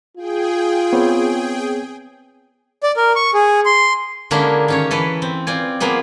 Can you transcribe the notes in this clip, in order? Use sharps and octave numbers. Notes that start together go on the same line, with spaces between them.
F4 G#4 G5
B3 C4 C#5
D5
A#4
C#6
G#4
C6
D3 G#3 A#3 C#4 D4 E4
D#3 C#4 C#5
E3 A4 B4
C4
C4 F4 D5 G#5
F3 A#3 B3 G#4